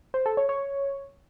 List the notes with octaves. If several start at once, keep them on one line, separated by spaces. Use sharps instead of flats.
C5
A4
C#5
C#5